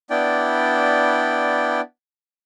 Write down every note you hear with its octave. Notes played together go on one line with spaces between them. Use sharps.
B3 D4 E4 D5 G5